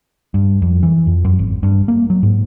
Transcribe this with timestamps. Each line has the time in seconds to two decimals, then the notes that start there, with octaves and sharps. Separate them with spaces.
0.34 G2
0.62 F2
0.83 E3
1.07 F2
1.25 F#2
1.39 G#1
1.63 G2
1.88 A#3
2.10 F#3
2.23 G#2